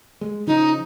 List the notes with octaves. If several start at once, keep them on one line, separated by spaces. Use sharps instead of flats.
G#3
C#3 F3 D#4